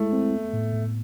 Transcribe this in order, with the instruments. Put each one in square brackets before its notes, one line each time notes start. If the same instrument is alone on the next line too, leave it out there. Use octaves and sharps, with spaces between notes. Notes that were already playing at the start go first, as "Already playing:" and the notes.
Already playing: [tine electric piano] G#3 E4 [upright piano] A3
[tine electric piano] C4
B3
A2
A2